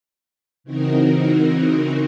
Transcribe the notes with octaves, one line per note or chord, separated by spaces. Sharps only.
C#3 E3 C4 D#4 F#4 A#4